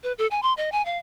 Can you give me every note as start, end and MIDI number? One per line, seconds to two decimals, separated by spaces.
0.03 0.12 71
0.18 0.27 69
0.31 0.40 80
0.42 0.53 84
0.57 0.72 75
0.72 0.84 80
0.85 0.98 77